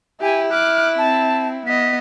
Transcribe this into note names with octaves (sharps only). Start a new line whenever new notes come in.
E4 G4 G#5
D6 F6 F#6
C4 A5
B3 D#5 B6